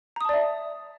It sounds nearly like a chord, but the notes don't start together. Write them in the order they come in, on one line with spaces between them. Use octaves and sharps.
A#5 D#6 A5 D5 E5